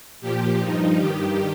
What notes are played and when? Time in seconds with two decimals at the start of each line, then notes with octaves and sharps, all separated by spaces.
0.21 A#2 F3 G4
0.59 G2 F3 D#4
0.97 G2 D#3 G4